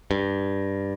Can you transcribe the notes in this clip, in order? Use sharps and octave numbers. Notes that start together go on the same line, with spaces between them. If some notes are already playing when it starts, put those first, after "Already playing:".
G2